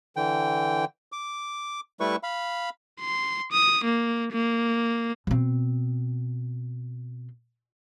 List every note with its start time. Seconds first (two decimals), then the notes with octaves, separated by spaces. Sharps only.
0.16 D3 E3 G5
1.12 D6
2.00 G3 A3 E4 B4 C#6
2.23 F5 B5
3.01 C6
3.52 D#6
3.84 A#3
4.33 A#3
5.27 B2 C4